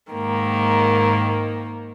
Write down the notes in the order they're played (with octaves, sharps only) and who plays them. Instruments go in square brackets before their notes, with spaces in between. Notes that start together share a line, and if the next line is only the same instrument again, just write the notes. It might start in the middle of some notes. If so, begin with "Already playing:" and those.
[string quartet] G#2 D#3 A#3